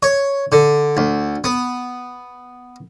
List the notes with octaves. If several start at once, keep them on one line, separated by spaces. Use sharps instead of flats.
C#5
D3
D2
B3